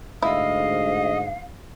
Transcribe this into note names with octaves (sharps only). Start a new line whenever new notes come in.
D2 G#2 E4 D#5 F5